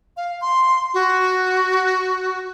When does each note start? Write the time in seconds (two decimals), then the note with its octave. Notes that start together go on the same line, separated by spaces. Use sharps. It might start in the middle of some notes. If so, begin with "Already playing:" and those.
0.17 F5
0.41 C6
0.94 F#4